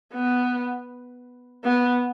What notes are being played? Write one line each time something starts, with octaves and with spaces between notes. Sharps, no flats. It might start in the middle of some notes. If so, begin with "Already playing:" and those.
B3
B3